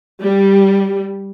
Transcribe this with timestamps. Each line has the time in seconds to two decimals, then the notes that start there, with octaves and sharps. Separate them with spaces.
0.22 G3